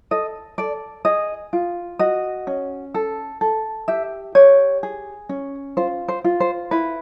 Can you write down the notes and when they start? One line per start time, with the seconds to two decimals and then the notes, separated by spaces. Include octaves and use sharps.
0.11 A4 D#5
0.58 A4 D5
1.05 G#4 D#5
1.53 F4
1.99 F#4 D#5
2.47 C#4
2.94 A4
3.41 A4
3.88 G4 E5
4.35 G4 C#5
4.83 G#4
5.29 C#4
5.77 F4 C5
6.08 C5
6.24 F4
6.40 C5
6.71 E4 B4